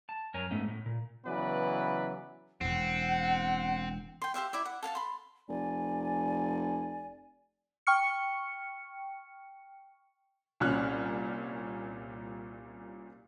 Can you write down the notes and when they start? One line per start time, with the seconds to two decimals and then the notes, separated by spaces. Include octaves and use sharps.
0.09 A5
0.34 F#2 A#4 C#5 G#5 A#5
0.51 G#2 A3 B3 C#4
0.68 A2
0.86 A#2
1.26 C#3 E3 F#3 B3 B4 D5
2.61 E1 E2 C4 F#5
4.22 G5 C6
4.34 G4 C5 E5 F5
4.53 E4 D5 E5
4.65 F#5
4.83 A4 F5 G#5 A5
4.95 B5 C6
5.48 F1 D5 G#5
7.87 G5 C#6 F6 C#7
10.60 C2 A#2 C#4 F6 F#6